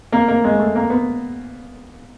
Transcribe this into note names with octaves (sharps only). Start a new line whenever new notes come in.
A#3
A#3
G#3
A3
A#3
B3